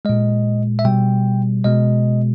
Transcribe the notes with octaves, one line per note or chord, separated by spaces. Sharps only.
A#2 G#3 D#5
E5
B2 G3 G5
B2 G#3 D#5